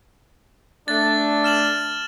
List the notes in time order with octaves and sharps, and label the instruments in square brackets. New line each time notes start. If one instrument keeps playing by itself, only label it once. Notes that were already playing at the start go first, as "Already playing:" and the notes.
[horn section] A3 D4 [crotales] A6
[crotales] F6 E7 F#7